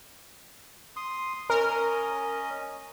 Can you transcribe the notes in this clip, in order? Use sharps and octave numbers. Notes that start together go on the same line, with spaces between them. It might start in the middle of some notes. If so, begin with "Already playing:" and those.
C6 D#6
C#4 A#4 D#5